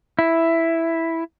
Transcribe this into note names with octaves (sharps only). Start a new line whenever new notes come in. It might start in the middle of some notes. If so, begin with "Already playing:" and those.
E4